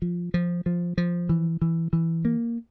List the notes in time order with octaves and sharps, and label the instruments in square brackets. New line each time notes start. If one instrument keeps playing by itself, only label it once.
[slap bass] F3
F3
F3
F3
E3
E3
E3
A#3